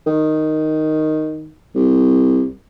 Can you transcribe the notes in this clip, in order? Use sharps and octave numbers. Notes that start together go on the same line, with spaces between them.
D#3
C2